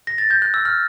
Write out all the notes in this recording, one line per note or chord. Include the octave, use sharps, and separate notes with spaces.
A#6
A6
G6
F#6
E6
F6